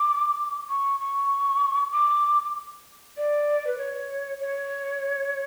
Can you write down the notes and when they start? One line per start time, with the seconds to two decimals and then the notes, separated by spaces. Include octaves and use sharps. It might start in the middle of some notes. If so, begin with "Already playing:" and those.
Already playing: D6
0.69 C#6
1.00 C#6
1.92 D6
3.16 D5
3.66 B4
3.78 C#5
4.40 C#5